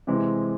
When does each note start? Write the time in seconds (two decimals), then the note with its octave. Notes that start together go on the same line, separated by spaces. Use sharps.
0.07 C3 E3 G#3 C4